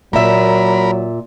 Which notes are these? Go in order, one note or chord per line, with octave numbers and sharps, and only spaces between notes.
A#2 F#3 A#4 E5 B5